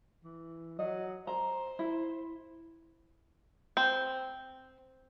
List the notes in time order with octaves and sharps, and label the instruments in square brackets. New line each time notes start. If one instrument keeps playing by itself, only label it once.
[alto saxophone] E3
[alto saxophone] F#3 [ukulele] D#5
[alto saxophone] C5 [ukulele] A#5
[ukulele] E4
[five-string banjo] C4